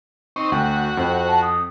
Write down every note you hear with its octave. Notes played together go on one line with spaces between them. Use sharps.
C4 D#4 C#6
D2 F#4 G5
F2 C5 G5
A5
D#6